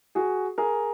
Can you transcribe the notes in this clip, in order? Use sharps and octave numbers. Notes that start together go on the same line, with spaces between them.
F#4 G#4
G#4 A#4